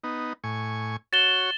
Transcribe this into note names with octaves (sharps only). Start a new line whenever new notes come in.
B3 D#4
A2 G#5 C#6
F#4 C#5 A6 E7 G7